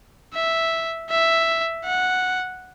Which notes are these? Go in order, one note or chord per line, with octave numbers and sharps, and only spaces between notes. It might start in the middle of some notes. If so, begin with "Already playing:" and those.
E5
E5
F#5